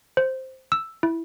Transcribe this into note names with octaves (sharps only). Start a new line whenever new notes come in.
C5
E6
E4